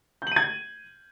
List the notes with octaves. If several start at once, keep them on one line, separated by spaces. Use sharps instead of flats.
G6 G#6 D#7 F#7